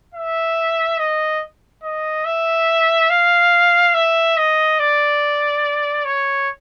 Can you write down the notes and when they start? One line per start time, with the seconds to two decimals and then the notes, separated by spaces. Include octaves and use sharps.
0.14 E5
0.99 D#5
1.84 D#5
2.25 E5
3.10 F5
3.94 E5
4.37 D#5
4.79 D5
6.05 C#5